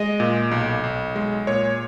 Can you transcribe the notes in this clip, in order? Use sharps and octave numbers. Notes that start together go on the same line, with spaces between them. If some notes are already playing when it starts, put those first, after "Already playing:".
Already playing: G#3 D#5
A#2
B1
B1
G#3
A#2 C#5